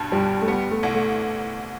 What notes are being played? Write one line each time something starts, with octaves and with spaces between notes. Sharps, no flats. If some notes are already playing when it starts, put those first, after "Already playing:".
Already playing: G2 B2
G1 G3
A3
G3 B3
A3
C2
A3